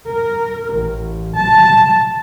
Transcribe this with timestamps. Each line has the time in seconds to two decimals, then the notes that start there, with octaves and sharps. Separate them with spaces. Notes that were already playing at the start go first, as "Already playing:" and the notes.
0.11 A#4
0.77 A1
1.39 A5